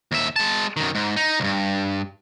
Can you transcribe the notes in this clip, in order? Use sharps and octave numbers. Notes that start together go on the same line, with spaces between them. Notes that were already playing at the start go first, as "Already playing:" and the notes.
D#2 E5
G#3 A5
F#2 D#3
G#2
D#4
C#2 G2